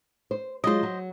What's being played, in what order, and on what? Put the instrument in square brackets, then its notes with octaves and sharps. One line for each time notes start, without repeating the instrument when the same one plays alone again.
[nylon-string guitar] C5
[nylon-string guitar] F#3 G#3 F4 [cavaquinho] C5 D#5
[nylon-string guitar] F#3